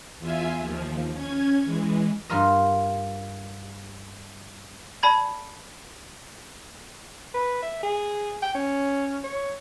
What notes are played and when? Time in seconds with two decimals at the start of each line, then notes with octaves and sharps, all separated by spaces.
0.19 E2 F4 E5 G#5
0.59 D#2 F3
1.13 C#4 G#6
1.65 E3 G#3
2.30 G2 G3 F4 A#4 D#5
5.03 D5 A5 B5 G#6
7.34 B4
7.62 E5
7.83 G#4
8.42 G5
8.55 C#4
9.24 C#5